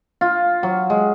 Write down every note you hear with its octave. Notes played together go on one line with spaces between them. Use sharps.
F4
F#3
G#3